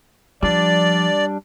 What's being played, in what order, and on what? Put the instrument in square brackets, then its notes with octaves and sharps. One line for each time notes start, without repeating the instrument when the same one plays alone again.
[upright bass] F3 [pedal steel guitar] G3 D4 [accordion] D5